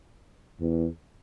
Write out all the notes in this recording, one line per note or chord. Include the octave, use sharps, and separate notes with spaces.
E2